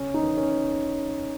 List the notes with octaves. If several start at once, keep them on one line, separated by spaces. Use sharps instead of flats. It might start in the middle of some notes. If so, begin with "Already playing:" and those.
Already playing: C#3 C#4
D#4
E2
C#4